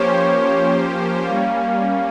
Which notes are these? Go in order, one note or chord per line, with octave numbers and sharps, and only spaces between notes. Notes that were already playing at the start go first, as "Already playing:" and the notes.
Already playing: F3 A#3 C#4 G4 C5 C#5
G3 A#3 C#4 F5